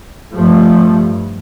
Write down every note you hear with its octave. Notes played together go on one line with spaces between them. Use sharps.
G2 F3 A3
G2